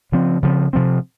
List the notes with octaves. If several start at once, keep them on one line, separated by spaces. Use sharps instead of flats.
C#3 F3 C4
C#3 F3 C4
C3 F3 C4